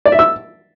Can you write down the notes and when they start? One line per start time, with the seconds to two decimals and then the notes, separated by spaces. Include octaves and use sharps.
0.06 D5
0.12 E5
0.19 E6